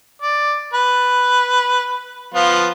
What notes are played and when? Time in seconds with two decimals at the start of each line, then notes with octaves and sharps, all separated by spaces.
0.22 D5
0.73 B4
2.34 F3 B3 F4